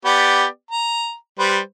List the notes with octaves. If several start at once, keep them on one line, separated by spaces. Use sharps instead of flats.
B3 G4 D5
A#5
G3 B4 C5